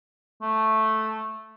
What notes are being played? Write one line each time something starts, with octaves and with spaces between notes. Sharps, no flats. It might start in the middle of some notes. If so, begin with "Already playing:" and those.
A3